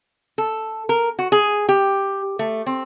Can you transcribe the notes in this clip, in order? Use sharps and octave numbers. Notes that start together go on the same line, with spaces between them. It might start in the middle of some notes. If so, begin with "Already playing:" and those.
A4
A#4
F#4
G#4
G4
A3
C4